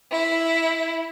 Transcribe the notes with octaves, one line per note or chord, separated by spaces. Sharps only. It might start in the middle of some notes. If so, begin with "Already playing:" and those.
E4